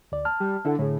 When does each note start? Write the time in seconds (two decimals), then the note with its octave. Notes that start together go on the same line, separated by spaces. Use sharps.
0.12 D2 D5
0.25 A5 F6
0.40 G3
0.65 D3 E4 A4 F#5
0.79 A2 D3 G#4